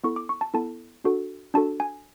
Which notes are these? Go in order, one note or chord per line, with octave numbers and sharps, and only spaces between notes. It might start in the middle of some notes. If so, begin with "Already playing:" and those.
B3 E4 A4 C#6
D6
C#6
A5
B3 E4 A4 A5
D4 F#4 A4
D4 F#4 A4 A5
G#5